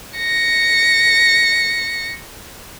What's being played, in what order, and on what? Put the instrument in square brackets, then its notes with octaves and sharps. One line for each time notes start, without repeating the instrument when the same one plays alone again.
[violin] A#6 C#7